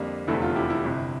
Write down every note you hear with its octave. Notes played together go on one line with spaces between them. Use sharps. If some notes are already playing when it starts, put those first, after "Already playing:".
Already playing: F2 D3 G3 A#3
F1 E2 D3 A3 E4
F4
E4 G4
E4
G1 F2 C3